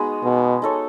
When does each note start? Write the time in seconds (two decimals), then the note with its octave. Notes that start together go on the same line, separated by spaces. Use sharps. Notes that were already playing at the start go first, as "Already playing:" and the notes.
Already playing: G#3 B3 D#4 F#4 B4
0.24 B2
0.62 D#4 A4 C#5